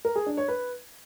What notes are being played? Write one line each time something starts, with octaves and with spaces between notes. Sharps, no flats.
A#4
G#4
D4
C#5
B4